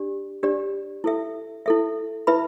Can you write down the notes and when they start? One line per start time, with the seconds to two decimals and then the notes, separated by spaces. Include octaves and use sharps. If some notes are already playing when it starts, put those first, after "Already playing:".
Already playing: D4 G4 D5
0.43 D4 G4 D5
1.04 E4 A4 E5
1.66 E4 A4 E5
2.27 E4 B4 E5 B5